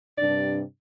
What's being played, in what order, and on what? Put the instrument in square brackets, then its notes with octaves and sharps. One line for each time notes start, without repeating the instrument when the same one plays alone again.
[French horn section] G2 C3 D4 [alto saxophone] D5